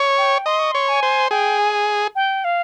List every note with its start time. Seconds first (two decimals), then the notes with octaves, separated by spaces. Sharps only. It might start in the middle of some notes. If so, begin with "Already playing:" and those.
Already playing: C#5
0.18 G5
0.46 D#5 C6
0.59 C#6
0.71 C#5 C6
0.88 G#5
1.03 C5
1.31 G#4 G5
1.59 G#5
2.16 G5
2.44 F5